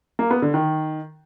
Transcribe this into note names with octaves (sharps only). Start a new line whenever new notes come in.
A#3
B3
D3
D#3